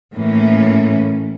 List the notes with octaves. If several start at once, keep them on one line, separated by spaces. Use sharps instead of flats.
A2 E3 A#3 C#4